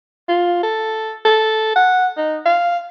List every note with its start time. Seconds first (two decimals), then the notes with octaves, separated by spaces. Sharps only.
0.28 F4
0.63 A4
1.25 A4
1.76 F#5
2.17 D#4
2.45 F5